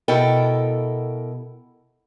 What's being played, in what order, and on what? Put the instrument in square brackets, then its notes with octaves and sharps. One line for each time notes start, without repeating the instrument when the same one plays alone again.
[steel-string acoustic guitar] B2 E4 A4 A#4 G5